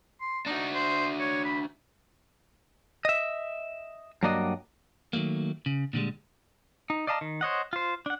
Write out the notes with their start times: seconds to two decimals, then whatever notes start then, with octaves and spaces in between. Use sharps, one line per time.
0.21 C6
0.46 D4 D#4 F#4
0.75 C5
1.20 C#5
1.45 B5
3.05 D#5 E5
4.23 G2 F#3 A#3 F#4 D5 D#5
5.13 D#3 F#3 A3 A#3
5.66 C#3
5.93 A#2 D3 G3 G#3
6.90 D#4
7.07 D5 D#5 F5 A5 A#5
7.21 D#3
7.41 C5 C#5 D#5 F#5
7.73 F4 C5
8.06 D4 F#5